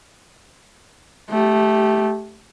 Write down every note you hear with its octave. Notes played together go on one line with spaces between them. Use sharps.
A3 G4